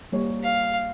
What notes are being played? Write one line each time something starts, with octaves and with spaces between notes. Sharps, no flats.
G3 A#3 C#5
F5